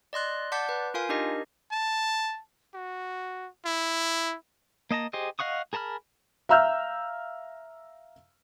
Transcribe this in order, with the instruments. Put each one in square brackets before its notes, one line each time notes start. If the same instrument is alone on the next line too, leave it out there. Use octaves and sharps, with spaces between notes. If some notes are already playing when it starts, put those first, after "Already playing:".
[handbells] D5 D#5 C6 F#6
D5 F#5 A5 D6 G6 B6
B4
F4 A#4 F5 G#5
D4 D#4 G4 A#4 D#5
[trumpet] A5
F#4
E4
[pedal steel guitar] A#3 D#5 A5 A#5
G4 G#4 C5 D#5
D#5 F5 F#5 C#6 D#6
G#4 A#4 A5 B5 F6
[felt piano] E5 F5 A#5 E6 F6 G6